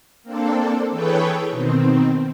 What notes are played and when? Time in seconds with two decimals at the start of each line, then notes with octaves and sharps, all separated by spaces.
0.23 A#3 C4 D4 A4
0.90 E3 G#4 A4 B4 C#5 G5
1.51 B2 D#3 C4